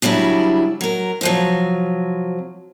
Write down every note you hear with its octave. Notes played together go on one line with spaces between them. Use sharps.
C#3 F#3 G3 D4 E4
F#3 A#4
C3 F3 F#3